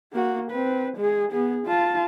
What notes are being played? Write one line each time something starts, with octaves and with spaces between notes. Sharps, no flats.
A#3 F#4
C4 B4
G#3 G#4
B3 G#4
F4 A5